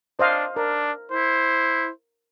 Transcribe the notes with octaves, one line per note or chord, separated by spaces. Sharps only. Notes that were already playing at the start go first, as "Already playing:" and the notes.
D4 C5 D#5 F5
D4 A#4
E4 C5